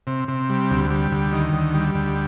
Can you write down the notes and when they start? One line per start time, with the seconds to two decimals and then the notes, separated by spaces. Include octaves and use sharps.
0.07 C3
0.28 C3
0.49 G3
0.70 D2
0.91 G3
1.12 D2
1.33 D#3
1.53 D2
1.74 G3
1.95 D2